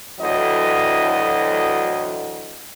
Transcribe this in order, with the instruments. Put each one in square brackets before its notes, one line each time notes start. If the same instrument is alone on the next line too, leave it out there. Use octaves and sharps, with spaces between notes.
[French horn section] D2 A2 E3 F#3 D#5